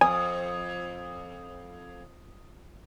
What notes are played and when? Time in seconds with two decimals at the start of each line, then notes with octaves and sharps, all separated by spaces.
0.01 F2 G#5 D#6